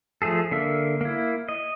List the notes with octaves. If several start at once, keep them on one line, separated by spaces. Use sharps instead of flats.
F3 A3 G#4 A4
D3 A#3 E5
A#3 E4
D#5